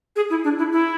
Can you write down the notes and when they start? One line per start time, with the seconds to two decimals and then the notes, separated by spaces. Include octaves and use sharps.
0.16 G#4
0.30 E4
0.44 D4
0.58 E4
0.72 E4